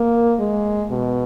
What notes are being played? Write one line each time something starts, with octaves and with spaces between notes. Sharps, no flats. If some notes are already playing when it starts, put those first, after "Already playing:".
Already playing: A#3
G#3
B2